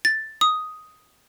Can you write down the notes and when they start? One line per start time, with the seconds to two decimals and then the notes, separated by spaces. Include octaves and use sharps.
0.05 A6
0.41 D#6